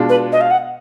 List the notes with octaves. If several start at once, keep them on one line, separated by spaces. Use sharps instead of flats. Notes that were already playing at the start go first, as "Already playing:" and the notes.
Already playing: B2 G#3 D4 F4
B4
D#5
F5
F#5